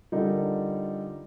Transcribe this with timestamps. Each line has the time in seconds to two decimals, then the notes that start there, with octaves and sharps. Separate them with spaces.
0.12 D3 G3 D#4 F4 A#4